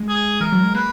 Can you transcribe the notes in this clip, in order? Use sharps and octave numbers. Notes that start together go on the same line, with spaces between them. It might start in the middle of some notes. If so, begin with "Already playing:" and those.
Already playing: G#3
G#4
E3 A#4
F#3
G#3
A#3 B4